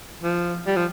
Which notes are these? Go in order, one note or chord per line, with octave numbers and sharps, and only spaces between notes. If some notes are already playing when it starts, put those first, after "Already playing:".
F3
G3
F3